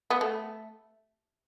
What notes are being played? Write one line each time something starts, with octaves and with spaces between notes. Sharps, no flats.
B3
A3